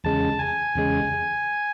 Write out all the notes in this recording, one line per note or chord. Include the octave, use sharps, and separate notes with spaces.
E2 C#3 G#3 A5
G#5
E2 C#3 G#3